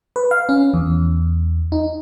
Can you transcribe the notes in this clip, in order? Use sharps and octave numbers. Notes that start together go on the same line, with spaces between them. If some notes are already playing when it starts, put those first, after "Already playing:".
B4
F5
C#4
E2
D#4